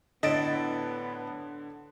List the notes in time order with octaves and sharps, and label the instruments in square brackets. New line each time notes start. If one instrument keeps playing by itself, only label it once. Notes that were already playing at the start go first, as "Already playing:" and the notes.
[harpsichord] A2 E4 E5 [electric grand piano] D3 A6 D7 [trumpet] B3 [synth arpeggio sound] D#5